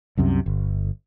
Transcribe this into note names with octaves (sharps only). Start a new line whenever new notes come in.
C2 F#2 C3
G1